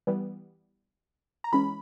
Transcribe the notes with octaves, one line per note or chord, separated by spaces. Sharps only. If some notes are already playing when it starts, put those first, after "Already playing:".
E3 G3 B3
A#5
E3 G#3 C#4 B5